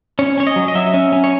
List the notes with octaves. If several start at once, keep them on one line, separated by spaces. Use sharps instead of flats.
C#4 C#5
C#4 C#5
D#5
F#3
D#5
F#3 E5
C#4
C#4
C#5